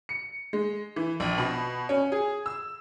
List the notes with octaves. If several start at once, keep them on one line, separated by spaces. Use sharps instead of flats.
C#7
G#3
E3
A#1
B2
C#4
G#4
E6